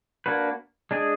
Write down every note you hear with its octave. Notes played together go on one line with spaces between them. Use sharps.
A#3 D4 F#4 B4
G#3 D4 G#4